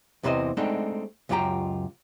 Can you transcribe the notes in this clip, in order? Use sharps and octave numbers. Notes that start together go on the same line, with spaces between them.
E2 C3 E3 B4 C5 D#5
G#3 A3 C4 D4 D#4
C#2 F#2 F4 G4 G5 A#5